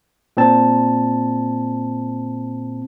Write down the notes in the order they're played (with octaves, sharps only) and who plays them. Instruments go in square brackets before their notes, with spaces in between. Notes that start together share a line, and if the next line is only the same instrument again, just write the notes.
[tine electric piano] A#2 C4 A5